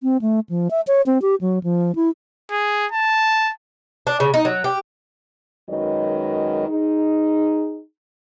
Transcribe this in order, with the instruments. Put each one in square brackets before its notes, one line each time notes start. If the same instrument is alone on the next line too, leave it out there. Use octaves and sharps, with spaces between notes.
[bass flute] C4
A3
F3
E5
C#5
C4
G4
F#3
F3
E4
[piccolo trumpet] G#4
A5
[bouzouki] D4
C#3
D#4
F#3
G4
[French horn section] F#2 D#3 F#3 G#3 B4 D#5
D#4 G#4